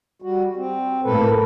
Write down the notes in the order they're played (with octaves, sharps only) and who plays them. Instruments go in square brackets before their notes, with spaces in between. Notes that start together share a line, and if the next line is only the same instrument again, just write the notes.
[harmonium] G3 F#4
C4
[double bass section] A2 A#3 [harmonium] A4 B4